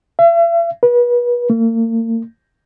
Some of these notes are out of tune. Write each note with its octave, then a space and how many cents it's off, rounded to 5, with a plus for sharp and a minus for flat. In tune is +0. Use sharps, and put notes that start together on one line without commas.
E5 +45
B4 -35
A#3 -40